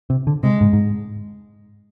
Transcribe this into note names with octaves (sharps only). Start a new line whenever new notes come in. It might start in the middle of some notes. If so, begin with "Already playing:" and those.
C3
D3
C3 G#3
G#2
G#2